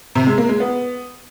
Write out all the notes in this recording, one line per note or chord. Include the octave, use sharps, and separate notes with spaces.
C3
G#3
A#3
G#3
B3